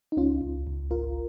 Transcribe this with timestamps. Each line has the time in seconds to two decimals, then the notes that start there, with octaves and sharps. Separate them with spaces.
0.12 D#4
0.17 C#2 C#4 F4
0.41 C#2
0.67 C#2
0.91 G#1 F4 A#4